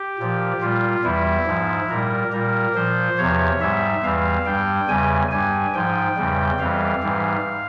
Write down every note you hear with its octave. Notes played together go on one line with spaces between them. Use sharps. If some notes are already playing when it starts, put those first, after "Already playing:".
Already playing: G4
A#2 F3
A#2 G3 F4
E2 E3 G3 E4
G#2 F3
A#2 G3 A#4
A#2 G3 A#4
A#2 F3 C5
E2 C3 F3 C#5
G#2 G3 E5
E2 E3 G3 F5
G2 G3 G5
E2 C#3 G3 G#5
G2 G3 G#5
G#2 F3 G5
E2 C#3 G3
F2 E3 G3 F5
G#2 E3 G3